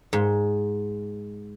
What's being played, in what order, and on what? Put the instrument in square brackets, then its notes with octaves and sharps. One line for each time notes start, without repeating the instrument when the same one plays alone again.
[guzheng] G#2